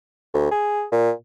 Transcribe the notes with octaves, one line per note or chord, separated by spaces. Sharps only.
D2
G#4
A#2